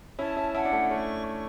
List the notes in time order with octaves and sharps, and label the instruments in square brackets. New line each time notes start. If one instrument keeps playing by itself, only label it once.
[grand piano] C#4 E4 [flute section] A5
[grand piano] C#4 E4
[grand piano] C#4 E4 [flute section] F#5
[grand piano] D4
A3 C#4
[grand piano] A3 C#4 [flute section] C#6
[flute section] C#6